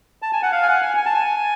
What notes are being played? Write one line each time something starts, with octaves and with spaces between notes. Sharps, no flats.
A5
G#5
F#5
F5
G#5
F#5
G#5
G#5
A5
G#5